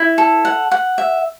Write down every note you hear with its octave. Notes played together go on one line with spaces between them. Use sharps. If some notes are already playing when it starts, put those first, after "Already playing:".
Already playing: E4
A4
F#5
F#5
E5